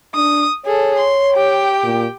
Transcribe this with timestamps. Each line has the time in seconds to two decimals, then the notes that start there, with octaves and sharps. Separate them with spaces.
0.15 D4 D#6
0.66 G#4 A4 C#5
0.98 C6
1.34 G4 G5
1.83 A#2